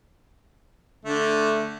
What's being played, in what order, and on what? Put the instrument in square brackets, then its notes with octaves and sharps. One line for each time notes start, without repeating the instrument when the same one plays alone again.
[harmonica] D3 A3